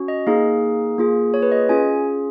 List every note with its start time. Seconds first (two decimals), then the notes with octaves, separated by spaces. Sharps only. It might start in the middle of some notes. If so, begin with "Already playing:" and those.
Already playing: C#4 F#4
0.08 D#5
0.27 A#3 D#4 G#4 F5
0.98 A#3 F4 G#4
1.34 C#5
1.42 B4
1.52 D#5
1.69 C#4 F4 G#4 G#5